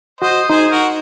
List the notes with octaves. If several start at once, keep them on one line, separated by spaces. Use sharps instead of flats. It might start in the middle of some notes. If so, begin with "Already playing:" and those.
F#4 C5 D#5
D#4 G#4 C5
F#4 A#4